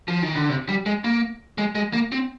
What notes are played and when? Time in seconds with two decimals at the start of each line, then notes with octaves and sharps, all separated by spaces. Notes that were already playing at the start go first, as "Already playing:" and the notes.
0.08 F3
0.23 D#3
0.36 D3
0.49 C3
0.69 G3
0.86 G#3
1.04 A#3
1.58 G#3
1.75 G#3
1.93 A#3
2.12 C4